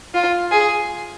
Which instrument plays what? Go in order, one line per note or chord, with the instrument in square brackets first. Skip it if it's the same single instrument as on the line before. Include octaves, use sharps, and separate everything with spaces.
[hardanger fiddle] F4
G#4